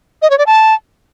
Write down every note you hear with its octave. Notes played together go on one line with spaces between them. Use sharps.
D#5
C#5
D5
A5